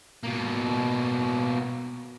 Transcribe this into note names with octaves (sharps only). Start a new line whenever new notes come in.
B2 A#3